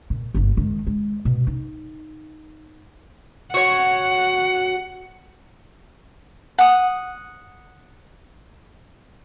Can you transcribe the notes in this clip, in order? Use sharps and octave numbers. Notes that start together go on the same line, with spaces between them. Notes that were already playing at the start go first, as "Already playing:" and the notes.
A#2
G1 A#3
D#3 G#3
G#3
B2
D#4
F#4 C#5 F#5
F#5 D#6